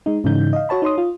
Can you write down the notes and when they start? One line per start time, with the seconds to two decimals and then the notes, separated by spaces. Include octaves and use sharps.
0.06 G#3 D#4
0.24 G#2 C#3 E3 D#4 G6
0.53 D#5 F5
0.69 F#4 C#5 A5 B5
0.82 D#4 C#5 C6 D#6
0.98 F4